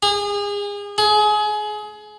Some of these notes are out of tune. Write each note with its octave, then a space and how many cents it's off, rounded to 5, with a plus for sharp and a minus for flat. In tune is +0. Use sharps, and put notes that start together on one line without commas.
G#4 -35
G#4 +25